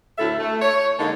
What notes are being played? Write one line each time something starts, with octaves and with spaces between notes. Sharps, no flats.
D2 A2 E4 A4 E5
A3
C#5
D3 G#3 A#3 D#4